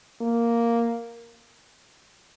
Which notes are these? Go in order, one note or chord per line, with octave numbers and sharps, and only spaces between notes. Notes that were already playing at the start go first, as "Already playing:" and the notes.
A#3